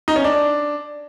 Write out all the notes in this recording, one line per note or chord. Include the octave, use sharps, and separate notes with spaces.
D#4
C#4
D4